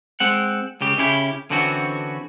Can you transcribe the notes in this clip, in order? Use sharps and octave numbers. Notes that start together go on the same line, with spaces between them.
G#3 C4 F#5
C#2 C#3 G4
C#3 C#4 E4 G4
D3 E3 C4 C#4 F#4